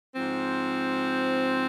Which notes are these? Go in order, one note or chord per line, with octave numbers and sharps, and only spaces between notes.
G#2 F3 C4